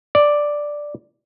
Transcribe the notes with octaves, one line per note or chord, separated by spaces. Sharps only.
D5